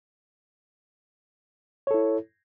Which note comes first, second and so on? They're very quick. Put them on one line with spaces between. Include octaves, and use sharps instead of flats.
C#5 A4 E4